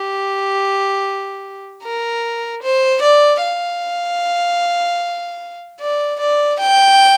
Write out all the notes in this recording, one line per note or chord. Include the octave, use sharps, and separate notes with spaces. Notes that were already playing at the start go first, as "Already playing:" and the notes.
Already playing: G4
A#4
C5
D5
F5
D5
D5
G5